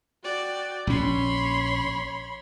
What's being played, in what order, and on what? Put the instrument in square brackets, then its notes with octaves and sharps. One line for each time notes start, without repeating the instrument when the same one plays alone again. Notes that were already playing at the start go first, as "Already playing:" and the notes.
[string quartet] F#4 D5 G5
[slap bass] A#1 C#4 [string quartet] C#5 B5 C6